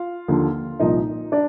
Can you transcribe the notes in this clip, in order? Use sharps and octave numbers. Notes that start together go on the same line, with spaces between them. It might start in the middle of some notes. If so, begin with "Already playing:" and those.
Already playing: F4 F5
D#2 D3 F3
C2 A#2 F3 D#4 D#5
D4 D5